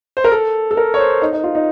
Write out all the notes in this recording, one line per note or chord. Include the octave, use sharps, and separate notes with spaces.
C5
A#4
A4
A4
A#4
C#5
C5
D#4
D#4
F4
D#4